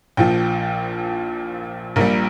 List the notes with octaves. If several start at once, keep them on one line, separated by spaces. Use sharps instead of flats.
A#1 A#2 F3 G5
A#1 A#2 G3 A#4